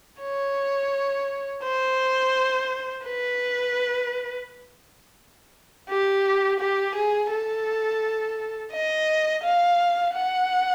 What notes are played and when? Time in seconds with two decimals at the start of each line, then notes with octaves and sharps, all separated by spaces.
0.22 C#5
1.64 C5
3.06 B4
5.89 G4
6.60 G4
6.95 G#4
7.31 A4
8.73 D#5
9.44 F5
10.15 F#5